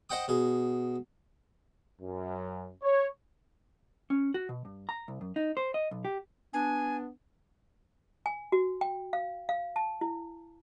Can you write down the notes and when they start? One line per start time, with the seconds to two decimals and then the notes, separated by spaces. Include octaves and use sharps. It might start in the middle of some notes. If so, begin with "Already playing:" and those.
0.10 C5 D#5 F#5 G5 D#6
0.28 B2 G#4
2.02 F#2
2.82 C#5
4.10 C#4
4.34 F#4
4.49 B2
4.65 G2
4.89 A#5
5.08 C2
5.21 F#2
5.36 D#4
5.57 C5
5.74 D#5
5.91 B1
6.05 G4
6.53 B3 D4 G#5
8.26 G#5
8.52 F#4
8.81 G5
9.13 F5
9.49 F5
9.76 A5
10.01 E4